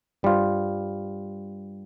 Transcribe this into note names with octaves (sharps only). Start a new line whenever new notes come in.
G2 G3 F4 C5